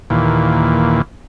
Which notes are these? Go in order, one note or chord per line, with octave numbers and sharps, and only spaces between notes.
D#2 A#2 E3